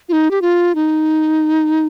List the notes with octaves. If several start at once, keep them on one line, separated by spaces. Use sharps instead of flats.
F4
D#4
G4
F4
D#4